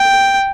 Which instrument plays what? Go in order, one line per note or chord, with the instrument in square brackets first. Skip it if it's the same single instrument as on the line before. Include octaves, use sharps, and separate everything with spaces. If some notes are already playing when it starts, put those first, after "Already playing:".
Already playing: [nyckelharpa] G5